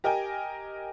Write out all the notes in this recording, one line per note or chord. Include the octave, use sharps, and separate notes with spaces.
G4 A#4 D#5 G5 G#5